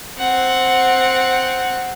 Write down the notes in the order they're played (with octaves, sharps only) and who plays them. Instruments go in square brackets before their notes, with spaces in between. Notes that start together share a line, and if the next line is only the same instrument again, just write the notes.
[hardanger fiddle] C4 F#5